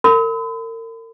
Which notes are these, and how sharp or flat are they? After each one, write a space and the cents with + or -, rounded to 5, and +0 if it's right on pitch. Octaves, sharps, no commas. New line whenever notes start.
A#4 -40 B5 +40